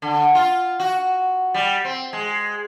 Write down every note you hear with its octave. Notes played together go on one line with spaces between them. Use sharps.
D3
F4
F#4
G3
C4
G#3